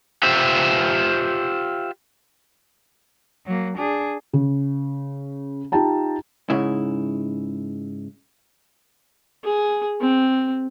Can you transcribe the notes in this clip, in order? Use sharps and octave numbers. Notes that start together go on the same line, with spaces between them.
F4 G4 C5 E5
F#3 A#3
D4 G#4
C#3
D#4 F4 G4 G5 A5 A#5
G#2 C#3 E4
G#4
C4